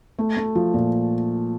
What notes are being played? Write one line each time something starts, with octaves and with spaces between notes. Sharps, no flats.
A3
A3
F3
A#2